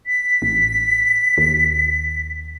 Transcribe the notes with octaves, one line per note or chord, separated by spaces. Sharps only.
B6
A1
D#2